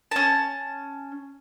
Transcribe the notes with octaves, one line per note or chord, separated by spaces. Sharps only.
C#4 A5